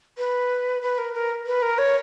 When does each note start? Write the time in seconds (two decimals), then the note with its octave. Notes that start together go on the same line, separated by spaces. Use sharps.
0.18 B4
0.82 B4
0.98 A#4
1.14 A#4
1.47 B4
1.62 A#4
1.78 C#5